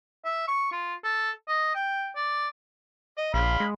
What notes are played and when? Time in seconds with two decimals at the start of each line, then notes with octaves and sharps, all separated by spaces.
0.25 E5
0.48 C#6
0.72 F4
1.04 A4
1.48 D#5
1.75 G5
2.16 D5
3.18 D#5
3.34 A#1 F5 B5 C6
3.60 G#3